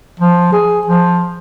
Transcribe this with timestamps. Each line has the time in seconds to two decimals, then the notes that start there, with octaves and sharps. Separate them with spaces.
0.20 F3
0.53 G#4
0.87 F3